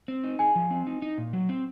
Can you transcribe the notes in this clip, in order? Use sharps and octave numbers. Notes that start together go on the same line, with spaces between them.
C4
D#4
G#4 G#5
F3
C4
D#4
D#4
A#2
F#3
C4